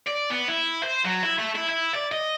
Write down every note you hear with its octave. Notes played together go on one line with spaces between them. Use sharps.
D5
B3
E4
C5
F#3
E4
A3
E4
E4
D5
D#5